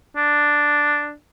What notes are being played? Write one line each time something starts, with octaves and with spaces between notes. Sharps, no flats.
D4